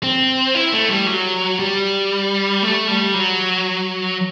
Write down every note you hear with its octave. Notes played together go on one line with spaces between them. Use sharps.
C4
E4
A3
G3
F#3
G3
A3
G3
F#3